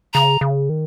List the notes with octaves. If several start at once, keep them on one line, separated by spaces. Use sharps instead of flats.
C#3 A#5
C#3
D#3